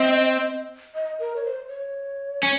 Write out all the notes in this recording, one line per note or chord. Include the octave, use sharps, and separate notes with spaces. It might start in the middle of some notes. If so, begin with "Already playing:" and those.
Already playing: C4 D#5
D#5
A#4
C#5
C5
C#5
C#4